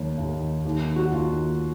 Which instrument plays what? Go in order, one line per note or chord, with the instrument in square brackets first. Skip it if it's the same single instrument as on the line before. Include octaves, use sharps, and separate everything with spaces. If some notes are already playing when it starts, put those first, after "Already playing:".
Already playing: [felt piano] D#2 D#3 C#5
D#2 D#3
D#2 D#3
F#4
D#2 D#3 F4